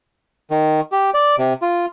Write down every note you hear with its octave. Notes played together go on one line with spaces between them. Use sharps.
D#3
G4
D5
C3
F4